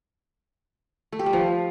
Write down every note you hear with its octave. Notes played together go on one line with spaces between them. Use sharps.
A3
G4
G3
F3